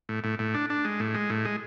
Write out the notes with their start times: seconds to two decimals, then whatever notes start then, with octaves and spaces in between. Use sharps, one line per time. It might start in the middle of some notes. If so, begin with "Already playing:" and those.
0.09 A2
0.24 A2
0.39 A2
0.54 D4
0.70 D4
0.85 G#3
1.00 A2
1.14 G#3
1.30 A2
1.45 G#3